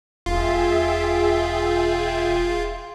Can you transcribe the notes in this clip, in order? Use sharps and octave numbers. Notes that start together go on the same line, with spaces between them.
E1 F4 G#4 E5 G5